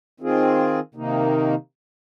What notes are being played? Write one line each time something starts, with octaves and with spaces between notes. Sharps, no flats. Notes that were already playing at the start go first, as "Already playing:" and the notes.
D#3 C4 F4 G#4
C3 D#3 A#3 D#4